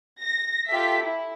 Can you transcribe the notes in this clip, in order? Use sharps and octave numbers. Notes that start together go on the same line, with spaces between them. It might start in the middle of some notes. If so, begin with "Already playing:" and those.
A#6
F4 G4 A4 E5 B6
E4